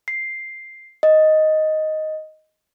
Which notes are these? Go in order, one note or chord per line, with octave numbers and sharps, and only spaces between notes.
C7
D#5